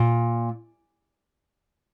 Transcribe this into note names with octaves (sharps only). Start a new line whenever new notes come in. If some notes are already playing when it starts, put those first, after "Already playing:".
Already playing: A#2